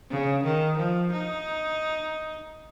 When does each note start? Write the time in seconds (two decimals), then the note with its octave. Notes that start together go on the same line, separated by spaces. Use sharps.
0.10 C#3
0.44 D#3
0.78 F3
1.13 D#4